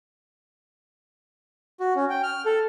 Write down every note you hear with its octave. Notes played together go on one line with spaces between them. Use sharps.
F#4
C#4
G5
F6
A4